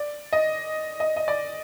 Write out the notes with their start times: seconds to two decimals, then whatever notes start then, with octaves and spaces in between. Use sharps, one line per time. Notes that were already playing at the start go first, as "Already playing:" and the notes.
Already playing: D5
0.33 D#5
1.00 D#5
1.16 D#5
1.28 D5